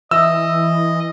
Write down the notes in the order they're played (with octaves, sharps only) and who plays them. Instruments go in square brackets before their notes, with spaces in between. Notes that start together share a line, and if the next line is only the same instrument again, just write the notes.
[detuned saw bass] E3 [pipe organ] D#5 [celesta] E5 [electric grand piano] E6